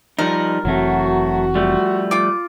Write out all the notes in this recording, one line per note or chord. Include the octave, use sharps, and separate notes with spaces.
F3 G3 D#4 A#4
F1 E3 F#3 A3 C4 F#4
F3 G3 A3
F4 D6